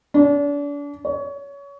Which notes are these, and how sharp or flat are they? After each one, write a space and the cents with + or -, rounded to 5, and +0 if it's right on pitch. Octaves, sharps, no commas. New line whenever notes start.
D4 -35
C#5 +25